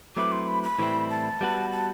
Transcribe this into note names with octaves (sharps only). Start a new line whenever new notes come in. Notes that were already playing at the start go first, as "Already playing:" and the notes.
F#3 A3 C4 E4 B4 D6
C6
B5
B5
A2 E3 G3 C4 E4
A5
G3 B3 F#4 B4
A5